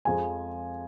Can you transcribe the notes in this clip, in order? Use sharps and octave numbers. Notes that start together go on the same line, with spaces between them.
F2 F3 G#3 G#5